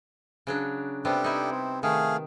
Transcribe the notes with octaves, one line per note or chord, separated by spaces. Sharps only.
C#3 F#3 D4
C3 G3 B3 D4 G4 A4
D#4 E4
C4
D#3 A3 G#4 F5